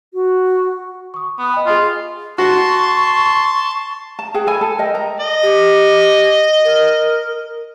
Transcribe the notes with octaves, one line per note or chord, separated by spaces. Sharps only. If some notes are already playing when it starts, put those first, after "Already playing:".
F#4
C#6 D#6
B3
D#5 G5
F4 G#4 D#5 G#5
F#4 A5 C6 C#6
A5
G#4 F#5 G5
A4 G#5 B5
A4
A#4 D#5 G5
D#5 A#5
D#5
G4
A#4